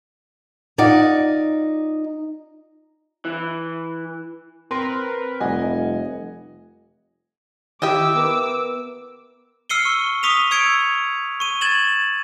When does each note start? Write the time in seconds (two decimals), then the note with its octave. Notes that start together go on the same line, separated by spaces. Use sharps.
0.78 D#4 F4 D5 F#5
3.25 E3
4.71 C4 A#4 B4 C6
5.40 F1 G3 D#5 F#5 G#5
7.82 D#3 E4 G4 D#5 E5 G5 D6 E6
8.15 B3 A#4 B4
9.69 E6 F6 C7 C#7 D#7 G7
9.85 C#6
10.23 C#6 D#6 B6 D#7 F7
10.51 C#6 E6 G#6 C#7 D7
11.40 C#6 D#7
11.61 G#6 A6 E7 F#7